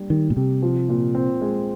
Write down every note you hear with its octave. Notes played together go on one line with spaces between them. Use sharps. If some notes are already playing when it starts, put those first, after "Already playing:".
Already playing: G3 A#3 D4
D#3 G3
A#2
C3 G4
F3
A#2
C4
G#3